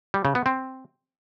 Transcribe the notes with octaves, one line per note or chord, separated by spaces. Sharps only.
G3
C#3
B3
C4